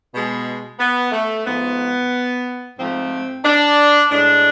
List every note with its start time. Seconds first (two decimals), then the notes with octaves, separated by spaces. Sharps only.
0.13 B2 G#3
0.79 B3
1.12 A3
1.45 G#2 F3 A3 B3
2.78 G#2 F3 A3 C4
3.44 D4
4.10 A2 G#3 D4